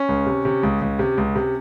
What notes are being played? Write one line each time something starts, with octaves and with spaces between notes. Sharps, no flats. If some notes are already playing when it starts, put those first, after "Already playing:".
Already playing: C#4
C#2
C3
C3
C#2
C#2
C3
C#2
C3